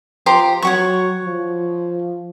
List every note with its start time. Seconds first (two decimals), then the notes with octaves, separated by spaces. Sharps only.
0.26 F3 G4 C5 A#5
0.62 F#3 C#5 F#5 C#6
1.24 F3